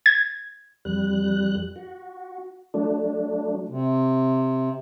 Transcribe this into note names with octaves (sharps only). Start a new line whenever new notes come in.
G#6
F2 G3 F#6
F#4
F#3 A3 D4
C3